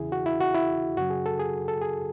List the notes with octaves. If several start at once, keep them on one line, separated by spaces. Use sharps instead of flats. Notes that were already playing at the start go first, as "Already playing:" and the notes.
Already playing: E2 C#3 E3 E4 G#4
F#4
E4
F#4
E4
F#2 C#3 F#3 F#4
G#4
A4
G#4
A4
G#4